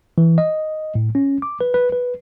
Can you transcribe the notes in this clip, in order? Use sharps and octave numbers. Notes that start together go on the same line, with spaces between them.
E3
D#5
A2
C#4
D6
B4
B4
B4